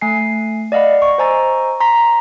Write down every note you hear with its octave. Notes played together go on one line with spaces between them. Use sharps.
A3 G#5 C7
D5 D#5 F5 F#5 B5
C#6
C5 D#5 G#5 A#5 E6 A6
A#5 C6 A#6 B6